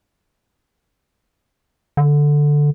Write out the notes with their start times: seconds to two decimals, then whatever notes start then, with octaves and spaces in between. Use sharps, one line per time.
1.97 D3